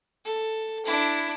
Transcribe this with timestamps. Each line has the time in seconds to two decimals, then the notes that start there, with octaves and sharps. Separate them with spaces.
0.25 A4
0.85 D4 E4